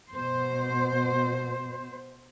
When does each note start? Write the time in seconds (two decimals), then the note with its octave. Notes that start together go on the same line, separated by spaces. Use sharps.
0.13 B2 C5